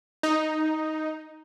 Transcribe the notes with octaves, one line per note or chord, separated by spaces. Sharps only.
D#4